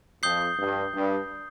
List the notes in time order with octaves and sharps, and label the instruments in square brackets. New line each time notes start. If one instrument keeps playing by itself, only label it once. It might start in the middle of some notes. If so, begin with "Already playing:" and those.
[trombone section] F2 [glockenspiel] D#6 G6 C7 G7
[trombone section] G2
G2